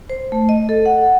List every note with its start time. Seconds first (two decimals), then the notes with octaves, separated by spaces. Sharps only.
0.10 C5
0.32 A3
0.49 D#5
0.69 A4
0.86 F#5